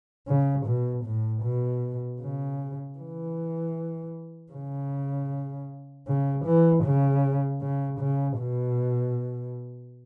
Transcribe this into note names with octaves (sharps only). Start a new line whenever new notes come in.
C#3
B2
A2
B2
C#3
E3
C#3
C#3
E3
C#3
C#3
C#3
B2